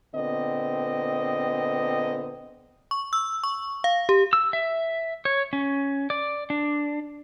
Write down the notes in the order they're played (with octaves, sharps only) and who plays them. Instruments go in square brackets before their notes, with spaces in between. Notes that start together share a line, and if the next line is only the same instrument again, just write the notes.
[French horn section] A#2 D3 B3 C4 D#5
[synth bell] C#6
E6
C#6
F5
G4
[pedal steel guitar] E6
E5
C#5
C#4
D5
D4